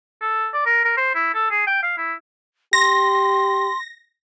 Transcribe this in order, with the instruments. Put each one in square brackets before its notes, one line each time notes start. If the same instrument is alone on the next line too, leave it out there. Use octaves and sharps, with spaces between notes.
[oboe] A4
D5
A#4
A#4
C5
E4
A4
G#4
G5
F5
E4
[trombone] G4 [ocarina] C6 [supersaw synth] A#6